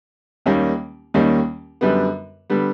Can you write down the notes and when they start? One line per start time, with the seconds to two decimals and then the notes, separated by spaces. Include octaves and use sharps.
0.46 D#2 D#3 G3 A#3 C#4
1.14 D#2 D#3 G3 A#3 C#4
1.81 F#2 D3 G3 B3
2.50 D3 G3 B3